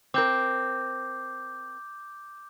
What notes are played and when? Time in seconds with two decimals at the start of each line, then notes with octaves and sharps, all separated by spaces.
0.14 C4 A#4 D6 G6